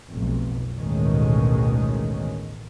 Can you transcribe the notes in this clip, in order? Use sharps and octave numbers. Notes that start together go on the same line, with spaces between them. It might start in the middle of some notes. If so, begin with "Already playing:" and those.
F1 B1
A1 D2 B2 D#3 G#3 C#4